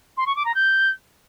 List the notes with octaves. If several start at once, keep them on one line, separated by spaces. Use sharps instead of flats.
C6
C#6
D6
A#5
G6